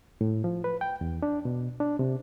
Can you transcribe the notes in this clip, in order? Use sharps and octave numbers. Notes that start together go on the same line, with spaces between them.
A2
F3
B4
G5
E2
D4
B2
D4
C3